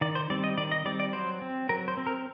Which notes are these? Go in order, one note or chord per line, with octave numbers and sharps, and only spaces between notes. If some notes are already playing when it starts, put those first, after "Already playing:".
D#3 D5
C5
G3 C4 D5
D#5
D#3 D5
D#5
G3 C4 D5
D5
F#3 C5
C4
F#3 A#4
C5
C4
A#4